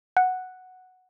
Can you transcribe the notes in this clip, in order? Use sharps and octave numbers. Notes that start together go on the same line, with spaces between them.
F#5